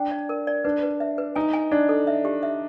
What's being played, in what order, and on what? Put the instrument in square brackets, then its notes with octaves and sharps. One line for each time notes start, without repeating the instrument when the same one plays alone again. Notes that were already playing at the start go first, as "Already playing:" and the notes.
Already playing: [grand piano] D4 [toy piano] G5
[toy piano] D5
A#4
D5
[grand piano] D4 [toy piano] B4
[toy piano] B4
E5
B4
[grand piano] D#4 [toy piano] G#5
[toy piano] G#5
[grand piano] D4 [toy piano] D5
[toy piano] A4
E5
G4
E5